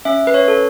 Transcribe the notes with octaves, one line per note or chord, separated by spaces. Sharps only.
C#4 E5
B4
C#5
A4